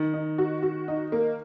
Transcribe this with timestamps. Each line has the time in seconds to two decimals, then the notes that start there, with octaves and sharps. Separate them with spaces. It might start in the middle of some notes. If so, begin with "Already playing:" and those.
Already playing: D#3
0.14 D#4
0.38 F#4
0.62 F#4
0.88 D#4
1.12 A#3